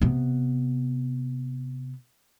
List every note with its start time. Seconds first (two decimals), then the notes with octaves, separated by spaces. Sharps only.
0.02 C3 B3